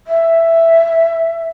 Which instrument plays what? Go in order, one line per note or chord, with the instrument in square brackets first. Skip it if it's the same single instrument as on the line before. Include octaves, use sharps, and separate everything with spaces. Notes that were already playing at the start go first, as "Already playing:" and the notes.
[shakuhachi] E5